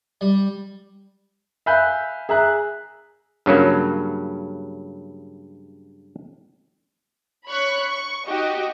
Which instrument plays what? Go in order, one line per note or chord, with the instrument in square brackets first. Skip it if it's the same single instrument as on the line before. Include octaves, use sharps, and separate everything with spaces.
[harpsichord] G3
[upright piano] E5 F5 G#5 B5 F#6 G6
G#4 E5 A#5 F#6
[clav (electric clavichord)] G2 C#3 F#3 A#3
[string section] C#5 B5 C#6 F#6
C#6
D#4 F#4 G4 D#5 G5